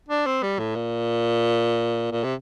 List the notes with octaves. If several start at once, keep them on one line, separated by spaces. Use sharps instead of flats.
D4
C4
G3
A2
A#2
A#2
C3